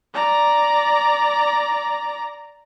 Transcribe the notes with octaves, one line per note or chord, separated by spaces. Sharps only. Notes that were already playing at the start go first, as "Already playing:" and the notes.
D5 A#5